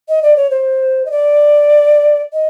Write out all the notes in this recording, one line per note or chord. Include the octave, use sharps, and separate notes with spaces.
D#5
D5
C#5
C5
D#5
D5
D#5